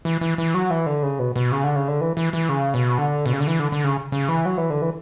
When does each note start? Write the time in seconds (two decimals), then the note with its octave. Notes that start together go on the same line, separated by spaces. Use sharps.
0.05 E3
0.21 E3
0.38 E3
0.54 F#3
0.70 E3
0.86 D3
1.03 C#3
1.19 B2
1.36 B2
1.52 C#3
1.64 D3
1.76 C#3
1.88 D3
2.01 E3
2.17 E3
2.33 E3
2.49 C#3
2.74 B2
2.98 D3
3.26 B2
3.33 C#3
3.40 D3
3.47 E3
3.59 D3
3.72 D3
3.84 C#3
4.12 C#3
4.28 E3
4.45 F#3
4.57 E3
4.70 D3
4.82 E3